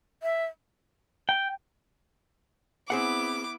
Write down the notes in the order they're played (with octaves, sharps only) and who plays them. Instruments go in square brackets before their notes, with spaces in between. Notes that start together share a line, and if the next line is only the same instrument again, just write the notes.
[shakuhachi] E5
[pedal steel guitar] G5
[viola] B3 E4 [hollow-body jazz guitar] C4 G#4 F#5 [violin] D6